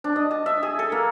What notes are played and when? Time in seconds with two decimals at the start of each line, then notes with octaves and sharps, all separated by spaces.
0.04 D4
0.16 D#5
0.31 A5
0.46 E5
0.63 G#4
0.79 A4
0.92 A#3